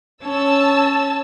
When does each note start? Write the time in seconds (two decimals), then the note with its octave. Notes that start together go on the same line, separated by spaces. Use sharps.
0.24 C#4 A5 E6